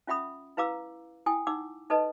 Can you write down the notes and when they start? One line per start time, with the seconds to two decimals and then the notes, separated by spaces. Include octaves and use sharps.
0.07 C#4 F4 E5 F#5 B5 D#6
0.57 E4 B4 F5 A#5 D6 E6
1.26 E4 G5 G#5 D#6
1.47 D#4 F#5 D6 E6
1.90 D#4 A4 B4 D#5 A5